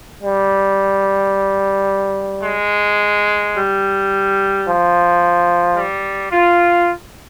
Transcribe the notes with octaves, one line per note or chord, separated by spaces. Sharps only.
G3
G#3
G3
F3
G3
F4